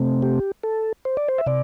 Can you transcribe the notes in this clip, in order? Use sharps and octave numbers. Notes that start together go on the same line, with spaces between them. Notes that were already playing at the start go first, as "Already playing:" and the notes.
Already playing: C3 A3 C4
G4
A4
C5
D5
C5
E5
C3 D5